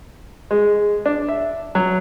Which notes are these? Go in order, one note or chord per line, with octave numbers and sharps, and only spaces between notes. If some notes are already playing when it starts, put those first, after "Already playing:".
G#3
D4
E5
F#3